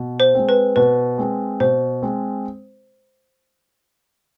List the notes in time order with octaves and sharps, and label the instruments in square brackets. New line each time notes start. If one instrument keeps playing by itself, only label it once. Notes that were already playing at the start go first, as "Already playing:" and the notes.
Already playing: [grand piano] B2
[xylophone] C5
[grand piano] G#3 C4
[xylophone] B4
[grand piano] B2 [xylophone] B4
[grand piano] G#3 C4
[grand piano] B2 [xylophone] C5
[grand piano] G#3 C4